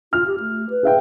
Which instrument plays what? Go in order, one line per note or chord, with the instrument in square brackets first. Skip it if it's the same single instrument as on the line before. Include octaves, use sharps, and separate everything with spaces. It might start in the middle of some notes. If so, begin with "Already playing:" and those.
[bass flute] F4 [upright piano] F6
[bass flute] G4
A3
B4
[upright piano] G#4 E5 G5